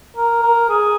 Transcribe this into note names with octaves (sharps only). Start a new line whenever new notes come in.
A#4
A#4
G#4